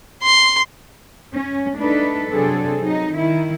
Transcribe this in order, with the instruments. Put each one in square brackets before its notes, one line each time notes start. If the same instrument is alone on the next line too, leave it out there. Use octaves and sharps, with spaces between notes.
[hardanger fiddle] C6
[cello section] C#4
A3 D4 D#4 A4 B4
C3 F#3 C4 D4 G#4 A4
F#3 D#4
D#3 E4